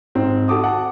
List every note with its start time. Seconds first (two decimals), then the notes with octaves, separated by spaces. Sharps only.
0.15 G#2 C4
0.48 F#4 A4 D6 D#6
0.64 F#5 A5